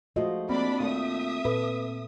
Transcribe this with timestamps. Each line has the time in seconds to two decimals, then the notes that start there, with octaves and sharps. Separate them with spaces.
0.16 F3 G#3 A3 F4 F#4 D#5
0.49 A#3 C4 D4 D5 B5
0.80 D#2 A3 F4 E5 D#6
1.45 A#2 A4 B4